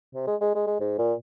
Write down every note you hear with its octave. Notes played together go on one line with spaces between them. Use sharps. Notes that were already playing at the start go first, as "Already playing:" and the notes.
C3
G#3
G#3
G#3
G#3
G#2
A#2